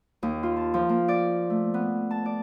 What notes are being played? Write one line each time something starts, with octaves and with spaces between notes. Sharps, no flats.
D#2
F4
A5
F3
A#3
D5
A3
B3
A5
D5